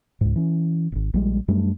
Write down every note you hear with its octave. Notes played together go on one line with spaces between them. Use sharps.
C#2 G#2
E3 C#4
D#1 G#1
A#1 G3 G#3
F#2 G3 A3 D4